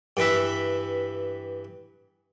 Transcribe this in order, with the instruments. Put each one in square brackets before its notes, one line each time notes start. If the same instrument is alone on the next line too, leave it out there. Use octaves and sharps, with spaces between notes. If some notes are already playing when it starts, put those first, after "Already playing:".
[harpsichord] G2 E3 B4 E5